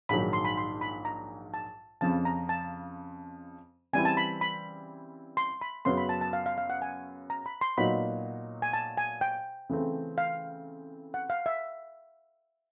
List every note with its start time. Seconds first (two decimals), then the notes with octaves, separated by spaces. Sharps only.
0.09 A#1 G#2 D#3 F#3 B5
0.33 C6
0.45 B5
0.57 C6
0.81 B5
1.05 A#5
1.54 A5
2.01 F2 C#3 F3 A5
2.25 A#5
2.49 A5
3.93 C#3 E3 G3 C4 E4 G#5
4.05 A5
4.17 B5
4.41 B5
5.37 C6
5.61 B5
5.85 F#2 C#3 F#3 B3 C6
5.98 B5
6.09 A5
6.21 A5
6.33 F5
6.46 F5
6.58 F5
6.70 F#5
6.82 G#5
7.30 A#5
7.46 B5
7.61 C6
7.77 A#2 F#3 B3 D#4 F#4 B5
8.62 G#5
8.73 A5
8.98 G#5
9.21 G5
9.69 C#3 E3 A3 C4
10.18 F5
11.14 F#5
11.30 F5
11.46 E5